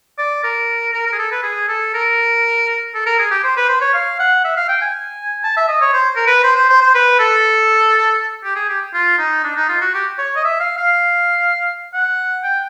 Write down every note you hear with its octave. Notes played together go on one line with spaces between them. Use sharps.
D5
A#4
A#4
A#4
G#4
A4
B4
G#4
A4
A#4
A4
A#4
G#4
G4
C5
B4
C5
C#5
F5
F#5
E5
F5
G5
G#5
A5
E5
D#5
C#5
C5
A#4
B4
C5
C5
C5
C5
B4
A4
G4
G#4
G4
F4
D#4
D4
D#4
F4
F#4
G4
C#5
D#5
E5
F5
F5
F#5
G5